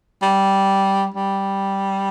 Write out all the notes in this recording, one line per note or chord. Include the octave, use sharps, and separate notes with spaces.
G3
G3